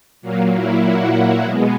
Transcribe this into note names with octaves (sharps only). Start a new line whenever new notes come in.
A#2 F#3 A#3
E4
F#4
B2 G#3 B3